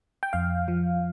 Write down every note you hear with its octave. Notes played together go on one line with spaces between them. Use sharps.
G5
F2 F5
F3